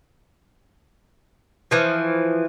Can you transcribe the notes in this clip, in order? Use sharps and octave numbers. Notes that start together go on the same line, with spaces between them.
E3 F3